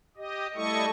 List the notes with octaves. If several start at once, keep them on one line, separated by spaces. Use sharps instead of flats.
G4 D#5
G3 A3 E4 A4 D#5 C#6